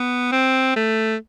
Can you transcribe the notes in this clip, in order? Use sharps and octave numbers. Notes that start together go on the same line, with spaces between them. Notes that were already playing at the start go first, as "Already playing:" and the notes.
Already playing: B3
C4
A3